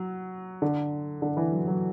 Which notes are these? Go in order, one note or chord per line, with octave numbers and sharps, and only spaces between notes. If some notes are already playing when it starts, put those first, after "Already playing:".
Already playing: F#3
D3
D3
E3
F#3
F#3